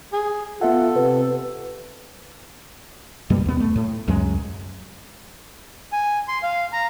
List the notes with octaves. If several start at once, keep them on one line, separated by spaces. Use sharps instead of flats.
G#4
B3 F4 A4 E5 F#5
C3 B4
F#2 B2 G3 A#3
D#2 B3
A3
A2
C#2 F#2 F#3 G#3
G#5
C6
F5
A#5